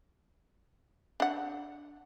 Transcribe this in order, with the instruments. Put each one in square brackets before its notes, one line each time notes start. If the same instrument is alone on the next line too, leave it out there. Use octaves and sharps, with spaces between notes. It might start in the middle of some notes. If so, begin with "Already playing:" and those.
[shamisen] D4 F#5